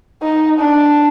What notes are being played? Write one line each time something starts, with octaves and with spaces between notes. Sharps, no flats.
D#4
D4